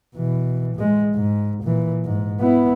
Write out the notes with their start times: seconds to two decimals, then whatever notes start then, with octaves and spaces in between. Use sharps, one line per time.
0.16 B2 E3
0.76 A2 G#3
1.15 G#2
1.64 A#2 E3
2.05 G#2
2.40 B3 E4